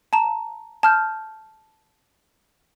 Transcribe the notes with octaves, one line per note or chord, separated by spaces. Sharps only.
A5 A#5 E7
A5 F6 G6